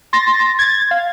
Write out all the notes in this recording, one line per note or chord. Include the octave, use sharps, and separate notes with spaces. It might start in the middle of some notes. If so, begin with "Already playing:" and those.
C6 A6 A#6
G#6 A6
F5